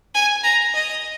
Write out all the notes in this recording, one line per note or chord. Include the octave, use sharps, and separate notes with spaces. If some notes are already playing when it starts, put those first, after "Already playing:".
G#5
A#5
D#5